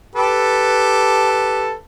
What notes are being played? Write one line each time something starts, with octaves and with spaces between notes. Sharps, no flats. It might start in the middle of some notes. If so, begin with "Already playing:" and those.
G4 A4 B4